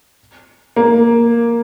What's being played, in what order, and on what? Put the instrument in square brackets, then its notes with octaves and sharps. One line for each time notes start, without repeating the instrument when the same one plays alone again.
[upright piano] A#3